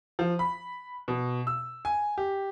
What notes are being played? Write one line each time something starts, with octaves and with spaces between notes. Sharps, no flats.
F3
B5
B2
E6
G#5
G4